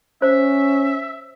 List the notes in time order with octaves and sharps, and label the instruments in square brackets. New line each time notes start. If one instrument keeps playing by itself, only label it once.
[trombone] C#4 [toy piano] C5 [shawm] E5